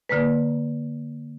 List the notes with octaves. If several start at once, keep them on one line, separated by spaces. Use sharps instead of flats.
D3 A#3 B4